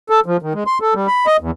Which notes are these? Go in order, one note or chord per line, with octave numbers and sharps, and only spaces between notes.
A4
F3
D#3
G#3
C6
A4
G3
B5
D#5
E2